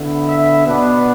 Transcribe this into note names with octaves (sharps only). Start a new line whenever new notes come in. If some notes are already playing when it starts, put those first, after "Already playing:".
Already playing: D3 B3 E4
E5
B2 B3 D4 B4